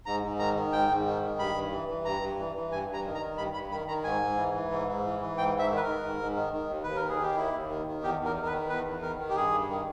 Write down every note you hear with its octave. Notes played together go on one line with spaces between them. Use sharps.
G#2 A#5
G#2
D#3 A#5
D#3
G#2 G5
G#2
D#3
D#3
G2 B5
G2
E3
E3
G2 A#5
G2
E3
E3
G2 G#5
G2
A#5
D#3
A#5
D#3
G2 B5
G2 B5
D#3 B5
D#3 A#5
G#2 G#5
G#2
E3
E3
G#2
G#2
E3
E3
G#2 G5
G#2 E5
D#3
B4
A#4
D#3
G#2
G#2
D#3
D#3
D#2
D#2 B4
A#4
D#3
G#4
D#3 G4
D#2 E4
D#2
D#3
D#3
E2 G4
E2
A#4
D#3
A#4
B4
D#3
E2 B4
E2
D#3 A#4
D#3
G4
G2 G#4
G2
D#3